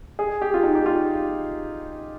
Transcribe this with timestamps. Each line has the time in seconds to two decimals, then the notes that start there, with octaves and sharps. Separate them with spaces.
0.19 G#4
0.42 G4
0.54 F4
0.63 D#4
0.75 G4
0.86 F4